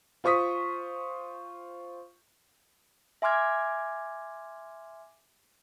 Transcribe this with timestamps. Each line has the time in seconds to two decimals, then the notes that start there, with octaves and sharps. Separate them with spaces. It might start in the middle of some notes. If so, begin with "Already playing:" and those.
0.24 F4 C5 C#6 D#6 B6
3.22 E5 G#5 C6 D6 F6 G#6